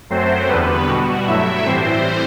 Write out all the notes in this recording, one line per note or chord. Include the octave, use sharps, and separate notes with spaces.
F#2 F#3 A3 C4 C5
E2 D3 G3 B3 B4
B2 G3 F#4
G2 F#3 A3 E4 E5
A2 E3 G3 C4 C5